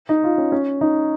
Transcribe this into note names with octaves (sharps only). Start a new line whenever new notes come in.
D#4
F4
C#4
C#4
D#4